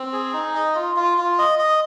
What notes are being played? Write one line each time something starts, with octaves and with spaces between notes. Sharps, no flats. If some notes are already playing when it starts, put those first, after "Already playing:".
Already playing: C4
G#4
D#4
D#5
F4
F4
F4
D#5
D#5